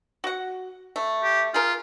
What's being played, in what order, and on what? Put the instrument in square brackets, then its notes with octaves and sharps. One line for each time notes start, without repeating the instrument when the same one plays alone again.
[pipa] F#4 F#5
A3
[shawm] G4
[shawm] F4 [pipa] G#4 A#4